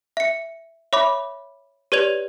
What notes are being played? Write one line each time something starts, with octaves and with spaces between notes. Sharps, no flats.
E5 C#7
C#5 E5 B5 D6
G4 B4 C#5 D5 G#6 F7